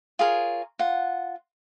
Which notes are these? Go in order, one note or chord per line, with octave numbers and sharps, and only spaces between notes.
F4 G#4 A#4 C#5
F4 F#5